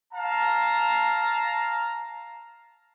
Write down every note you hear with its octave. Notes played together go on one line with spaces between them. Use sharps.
F5 A5 A#5